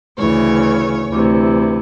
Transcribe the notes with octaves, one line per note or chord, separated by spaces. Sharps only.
D2 C#3 E3 C#5
D2 C3 E3